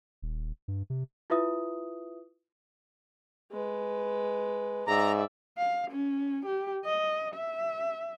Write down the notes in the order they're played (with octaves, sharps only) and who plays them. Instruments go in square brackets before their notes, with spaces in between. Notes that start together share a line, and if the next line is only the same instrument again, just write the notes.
[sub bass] D#1
G2
C3
[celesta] E4 F4 B4 E5 D#6
[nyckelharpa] G#3 B4
[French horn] G#2 [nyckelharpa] D5 E5 [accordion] A#5
[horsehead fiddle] F5
C#4
G4
D#5
E5